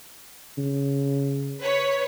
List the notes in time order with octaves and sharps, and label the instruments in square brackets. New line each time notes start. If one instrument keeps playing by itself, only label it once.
[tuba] C#3
[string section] B4 C#5